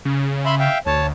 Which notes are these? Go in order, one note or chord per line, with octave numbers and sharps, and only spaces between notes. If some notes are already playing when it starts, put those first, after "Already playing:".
C#3
E5 B5 C6
E5 F5 G5
D2 C#5 A5